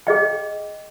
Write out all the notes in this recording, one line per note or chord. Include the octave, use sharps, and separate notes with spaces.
G#4 D#5 G5